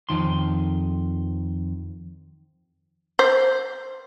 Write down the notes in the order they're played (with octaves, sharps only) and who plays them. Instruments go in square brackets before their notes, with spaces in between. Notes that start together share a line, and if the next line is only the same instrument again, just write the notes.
[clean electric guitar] F2 D#3 C6
[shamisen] C5